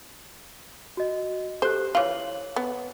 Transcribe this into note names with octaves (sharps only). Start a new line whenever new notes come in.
F#4 D#5
G4 A4 C5 F#6
E3 F4 C#5 F#7
B3